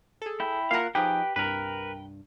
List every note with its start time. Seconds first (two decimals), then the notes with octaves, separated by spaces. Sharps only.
0.22 G#4 A4
0.40 E4 G5
0.71 A#3 F4 A#4 F5 F#5
0.95 F3 D#4 G4 G#4 B4 G5
1.36 C2 G2 A#4 B4